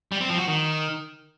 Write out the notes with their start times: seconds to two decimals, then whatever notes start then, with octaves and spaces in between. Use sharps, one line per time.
0.12 G3
0.21 C4
0.29 F3
0.38 F#4
0.47 D#3